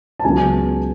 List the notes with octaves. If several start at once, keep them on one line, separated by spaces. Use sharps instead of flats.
A5
C#2 C#3 F#3 B3 G#5